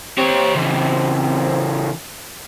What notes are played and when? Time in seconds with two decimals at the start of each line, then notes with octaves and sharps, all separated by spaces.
0.18 C4 G4 C#5
0.55 C#3 E3